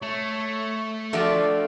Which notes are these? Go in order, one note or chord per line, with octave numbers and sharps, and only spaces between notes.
A3 C#5
F3 A3 D4 F4 F#4 A4 D5